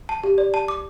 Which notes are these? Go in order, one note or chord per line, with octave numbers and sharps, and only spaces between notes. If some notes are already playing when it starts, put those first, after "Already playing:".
A5
G4
D5
A5
D6